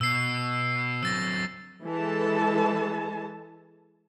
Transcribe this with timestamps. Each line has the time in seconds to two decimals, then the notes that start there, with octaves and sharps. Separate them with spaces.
0.01 B2 E6 C7
1.03 F#3 C4 E6 A6 A#6
1.83 E3 G#3 A4 A5